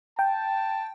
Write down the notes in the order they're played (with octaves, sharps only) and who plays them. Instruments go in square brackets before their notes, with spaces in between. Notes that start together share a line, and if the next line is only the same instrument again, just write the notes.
[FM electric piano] G5 [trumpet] A5